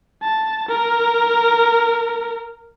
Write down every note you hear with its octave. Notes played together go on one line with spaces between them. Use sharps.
A5
A#4